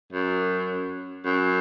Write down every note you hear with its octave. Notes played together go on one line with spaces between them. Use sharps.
F#2
F#2